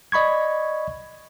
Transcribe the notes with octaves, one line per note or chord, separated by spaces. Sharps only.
D5 D#5 B5 C#6 G#6